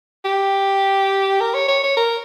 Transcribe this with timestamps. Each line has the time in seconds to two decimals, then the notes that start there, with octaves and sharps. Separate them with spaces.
0.25 G4
1.40 A#4
1.54 C#5
1.68 C#5
1.83 C#5
1.97 A#4